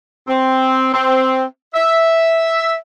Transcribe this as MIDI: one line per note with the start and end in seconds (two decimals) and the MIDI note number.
0.28 0.91 60
0.93 1.44 60
1.74 2.74 76